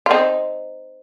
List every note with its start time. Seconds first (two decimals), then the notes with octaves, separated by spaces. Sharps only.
0.06 F4
0.11 C4 D#4